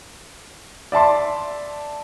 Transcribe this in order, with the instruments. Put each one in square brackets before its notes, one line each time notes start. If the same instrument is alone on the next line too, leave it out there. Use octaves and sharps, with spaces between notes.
[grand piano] D5 E5 A5 C6